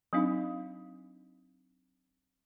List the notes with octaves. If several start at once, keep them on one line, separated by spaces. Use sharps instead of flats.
F#3 C4 D4 D#4 F5